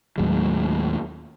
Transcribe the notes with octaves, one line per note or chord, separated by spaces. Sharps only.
D#2 A2 F#3 G#3